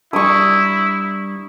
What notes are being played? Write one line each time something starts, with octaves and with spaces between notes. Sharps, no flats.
G3 D4 E4 C#6 D#6